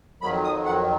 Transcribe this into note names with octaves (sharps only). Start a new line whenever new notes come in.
F2 D#3 F#3 B5
D#6
F#5